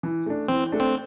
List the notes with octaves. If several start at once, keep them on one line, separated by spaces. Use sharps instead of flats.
E3
A3 D4
E3 C4
A3 D4
C4